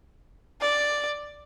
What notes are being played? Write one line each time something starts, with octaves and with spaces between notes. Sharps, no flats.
D5